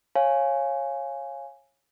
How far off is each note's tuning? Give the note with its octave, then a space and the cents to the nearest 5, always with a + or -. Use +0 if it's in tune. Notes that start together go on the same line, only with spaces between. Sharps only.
C#5 -20 F5 -5 G#5 +0